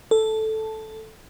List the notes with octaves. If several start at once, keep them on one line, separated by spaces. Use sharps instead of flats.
A4